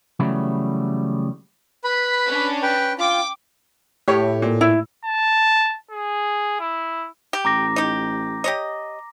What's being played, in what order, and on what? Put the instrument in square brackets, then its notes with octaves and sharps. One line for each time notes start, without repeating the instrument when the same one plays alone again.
[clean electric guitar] C#3 E3 F#3 G3 A3 B3
[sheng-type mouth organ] B4 B5
[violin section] C#4 D4
[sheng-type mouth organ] B4 G5
[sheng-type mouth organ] F4 [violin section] G5 D6
[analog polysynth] A2 [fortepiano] G4 C#5
[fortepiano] A#2
[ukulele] E4
[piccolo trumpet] A5
G#4
E4
[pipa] G4
[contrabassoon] A1 [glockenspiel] A#5 D6 A#6
[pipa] D#4 G4
G4 C#5 D#5